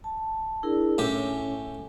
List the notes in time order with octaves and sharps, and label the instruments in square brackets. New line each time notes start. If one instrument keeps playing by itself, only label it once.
[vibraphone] A5
[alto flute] D4 [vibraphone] E4 G#4 A#4
[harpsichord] A2 G4 [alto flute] C#4 [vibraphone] G#5